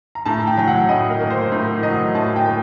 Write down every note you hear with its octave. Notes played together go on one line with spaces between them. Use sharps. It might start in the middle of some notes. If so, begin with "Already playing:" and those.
A#5
A2 A5
G5
F#3 G5
F#5
A2 D#5
A#4
A#3
C5
A2
F#3 D#5
A2 A5
G5
A#3